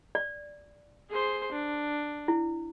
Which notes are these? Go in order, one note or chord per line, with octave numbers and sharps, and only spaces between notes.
D5
G#4 C5
D4
E4